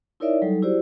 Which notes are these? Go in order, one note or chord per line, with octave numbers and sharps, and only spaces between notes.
D#4 E4 A#4 C#5 D5 E5
F#3 G3 D#4 A4
E4 F#4 G4 C5 D5